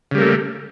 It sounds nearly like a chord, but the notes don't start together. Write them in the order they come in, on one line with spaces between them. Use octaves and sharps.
C#3 G3 A#3 A3